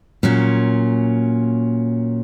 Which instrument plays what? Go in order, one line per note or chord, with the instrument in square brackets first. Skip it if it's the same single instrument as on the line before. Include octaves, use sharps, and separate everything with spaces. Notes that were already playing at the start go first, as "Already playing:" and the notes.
[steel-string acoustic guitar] A#2 F#3 C#4